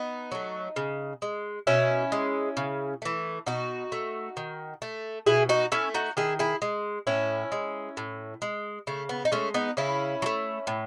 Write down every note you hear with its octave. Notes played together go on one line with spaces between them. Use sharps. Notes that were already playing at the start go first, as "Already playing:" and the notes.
Already playing: B3 D#4
F#3 A3
C#3
G#3
B2 C#4 E4
G#3
C#3
E3 A3
B2 D#4 F#4
A3
D#3
A3
B2 E4 G#4
D#4 F#4
A3 C#4 E4
D#4 F#4
D#3 E4 G#4
E4 G#4
G#3
A2 C#4 E4
G#3
A2
G#3
C#3 A3
B3
D#4
G#3 A3 C#4
B3 D#4
C#3 C#4 E4
F#3
A3
A2